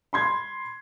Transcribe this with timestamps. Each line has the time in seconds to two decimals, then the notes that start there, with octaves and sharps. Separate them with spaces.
0.13 B5 C6 G#6